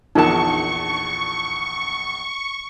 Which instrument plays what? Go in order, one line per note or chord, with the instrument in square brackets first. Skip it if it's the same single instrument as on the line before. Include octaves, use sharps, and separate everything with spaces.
[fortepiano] A#1 E2 A#2 [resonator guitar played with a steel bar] D3 A5 [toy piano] D#4 A#4 [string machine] C#6